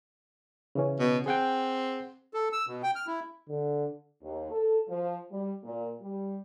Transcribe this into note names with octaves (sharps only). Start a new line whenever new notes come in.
C#3 E3 C#4
B2
C4 G#4 F#5 G5
A4
E6
B2
G5
F6
E4
D3
D#2
A4
F3
G3
A#2
G3